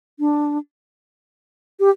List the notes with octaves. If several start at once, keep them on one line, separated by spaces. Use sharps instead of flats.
D4
G4